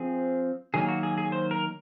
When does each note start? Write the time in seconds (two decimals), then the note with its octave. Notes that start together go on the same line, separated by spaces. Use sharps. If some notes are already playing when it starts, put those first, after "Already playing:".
Already playing: F3 C4 G#4
0.74 D#3 F#3 A#3 G#4
0.88 F#4
1.03 G#4
1.18 G#4
1.32 C5
1.51 A#4